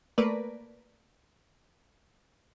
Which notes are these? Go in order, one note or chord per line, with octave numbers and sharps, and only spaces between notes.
A3 A#3 A#4 B4 D5